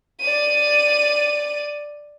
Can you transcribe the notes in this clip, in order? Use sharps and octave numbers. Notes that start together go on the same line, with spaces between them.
D5 D#7